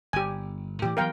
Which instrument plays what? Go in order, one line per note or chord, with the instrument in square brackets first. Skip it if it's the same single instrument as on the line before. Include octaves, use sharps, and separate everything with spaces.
[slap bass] G1 [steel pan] G4 G#5
[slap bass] A2 E3 [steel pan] G4
[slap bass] E3 F#3 B3 [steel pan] A#4 F5 G5